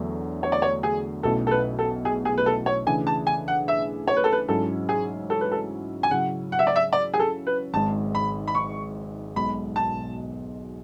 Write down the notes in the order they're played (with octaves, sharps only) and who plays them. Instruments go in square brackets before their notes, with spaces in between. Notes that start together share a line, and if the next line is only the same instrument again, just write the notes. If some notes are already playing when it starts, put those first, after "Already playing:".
Already playing: [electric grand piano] E2 D3 F#3 A3
[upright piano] C#5
D5
C#5
G#4
[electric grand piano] B1 B2 A3 C#4 E4 [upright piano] A4
[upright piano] A4
B4
A4
G#4
G#4
B4
A4
C#5
[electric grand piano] C#3 E3 A3 D4 G#4 [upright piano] G#5
[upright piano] A5
G#5
F#5
E5
C#5
B4
A4
B4
[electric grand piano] G#2 F#3 C#4 E4 [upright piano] A4
[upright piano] G#4
A4
B4
A4
G#5
[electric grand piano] C#3 F#3 C#4 E4 [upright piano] F#5
[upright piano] F#5
E5
D5
E5
D5
G#4
A4
B4
[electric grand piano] G#1 G#2 G#3 [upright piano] A5
[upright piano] B5
B5
C#6
[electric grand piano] B1 B2 G#3 [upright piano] B5
[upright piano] A5